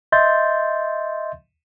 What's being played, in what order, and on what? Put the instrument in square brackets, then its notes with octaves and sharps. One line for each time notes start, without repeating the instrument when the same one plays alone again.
[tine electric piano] D#5 E5 C6 G6 A6